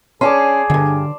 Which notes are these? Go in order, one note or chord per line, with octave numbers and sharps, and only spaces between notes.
C#4 G#4 D5 A5 C6
D2 G2 D3